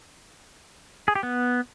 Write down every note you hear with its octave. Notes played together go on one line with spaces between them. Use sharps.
G#4
G4
B3